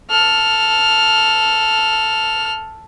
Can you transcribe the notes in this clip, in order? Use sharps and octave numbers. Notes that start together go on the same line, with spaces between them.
A4 F6